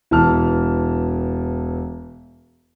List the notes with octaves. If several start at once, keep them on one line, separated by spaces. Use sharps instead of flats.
E1 E3 A5 F6